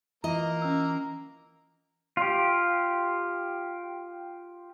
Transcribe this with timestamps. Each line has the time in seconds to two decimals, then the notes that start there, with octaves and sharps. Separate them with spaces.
0.24 E3 A#3 F4 D#5 A#5
0.62 C#4 E6
2.17 F4 G4